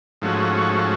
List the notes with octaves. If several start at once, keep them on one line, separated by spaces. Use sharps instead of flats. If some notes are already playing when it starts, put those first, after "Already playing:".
G#2 F3 A3 C#4 F#4